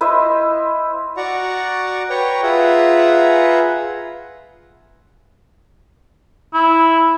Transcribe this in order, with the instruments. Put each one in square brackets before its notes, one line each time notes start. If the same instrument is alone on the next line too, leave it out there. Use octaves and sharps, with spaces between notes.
[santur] E4 B4 C5 D#5
[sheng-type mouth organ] F#4 D5 F#5 A#5 C#6
B4 C#5 G5 A#5 C#6
F4 G#4 B4 E5 F#5 A#5
[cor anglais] E4